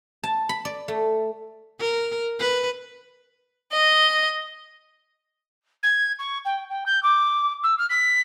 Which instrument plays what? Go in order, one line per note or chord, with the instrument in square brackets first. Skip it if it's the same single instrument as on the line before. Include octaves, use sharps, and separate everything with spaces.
[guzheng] A5
B5
D5
A3
[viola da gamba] A#4
B4
[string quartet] D#5
[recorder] G#6
C#6
G5
G5
G6
D6
E6
F6
B6